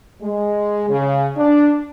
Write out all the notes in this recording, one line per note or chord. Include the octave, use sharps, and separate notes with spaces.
G#3
C#3
D4